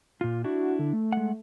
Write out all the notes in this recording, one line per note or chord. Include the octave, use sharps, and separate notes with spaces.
A#2 F4
D4 E4 F#4
D3
A3
G#3 F#5